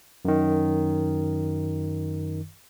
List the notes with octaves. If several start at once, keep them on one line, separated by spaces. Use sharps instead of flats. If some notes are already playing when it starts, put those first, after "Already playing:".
F#2 D#3